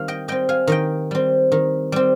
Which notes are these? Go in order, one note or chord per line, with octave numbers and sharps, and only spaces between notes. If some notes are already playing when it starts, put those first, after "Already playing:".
Already playing: D#3 G3 C4 F5
D#5 G5
G3 C4 D#5 G5
F5 G#5
D#3 D#5 G5
G3 C4
D#3
G3 C4